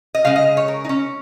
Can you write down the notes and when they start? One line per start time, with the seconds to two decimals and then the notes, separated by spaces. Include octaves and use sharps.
0.14 D#5
0.25 C#3 G#3 F5
0.36 D#5
0.57 C#5
0.68 A#4
0.84 D#4
0.89 C#4